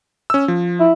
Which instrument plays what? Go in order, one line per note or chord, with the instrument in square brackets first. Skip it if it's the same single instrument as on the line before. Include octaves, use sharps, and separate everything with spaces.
[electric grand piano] C#4 E6
F3
[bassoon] E4